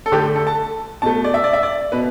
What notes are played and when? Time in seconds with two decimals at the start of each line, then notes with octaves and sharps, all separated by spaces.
0.06 A4
0.12 D3 A3 G4
0.36 A4
0.47 A5
1.02 B2 A3 A5
1.24 D5
1.34 E5
1.44 D5
1.53 E5
1.63 D5
1.92 B2 B4